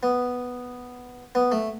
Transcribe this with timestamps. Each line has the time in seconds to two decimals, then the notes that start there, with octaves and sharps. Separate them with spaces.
0.03 B3
1.35 B3
1.52 A3